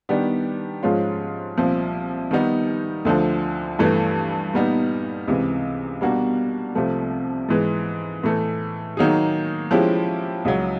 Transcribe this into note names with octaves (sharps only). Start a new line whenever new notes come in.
D#3 G3 B3 D4 G4
G#2 F3 G#3 C#4 F4
C2 A#2 F3
D#3 G3 B3 D#4
D2 D3 F3
G2 E3 A3
A#2 G3 B3 D#4
C#2 C3 E3
B2 G3 A#3 D4 F#4
C2 C3 F3 A3
G#2 E3 G#3
A2 E3 A3
D#3 F#3 A#3 D#4 G#4
F3 G#3 C#4 E4 G4
C#2 C#3 F#3